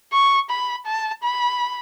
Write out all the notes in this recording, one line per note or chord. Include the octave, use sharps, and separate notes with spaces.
C#6
B5
A5
B5